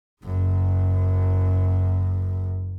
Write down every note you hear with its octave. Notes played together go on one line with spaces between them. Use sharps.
F#1 F#2